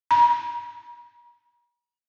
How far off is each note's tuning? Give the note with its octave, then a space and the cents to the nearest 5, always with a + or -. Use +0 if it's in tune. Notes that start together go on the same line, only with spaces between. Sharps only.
A#5 +45